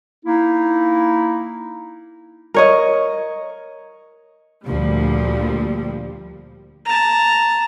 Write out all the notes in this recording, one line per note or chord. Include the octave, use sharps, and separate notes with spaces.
A#3 D#4 E4
A#4 C#5 D#5
D2 A#2 F3 G3
A5 A#5